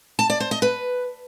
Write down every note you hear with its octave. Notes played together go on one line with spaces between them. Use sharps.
A5
D5
C5
D#5
B4